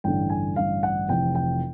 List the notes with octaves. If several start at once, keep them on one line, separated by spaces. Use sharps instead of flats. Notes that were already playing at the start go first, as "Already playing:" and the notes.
A1 G2 D3 G5
G#5
A1 G2 D3 F5
F#5
F1 F2 C3 E3 G5
G5